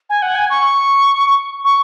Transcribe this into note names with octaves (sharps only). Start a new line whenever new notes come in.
G#5
F#5
G#5
C#6
C#6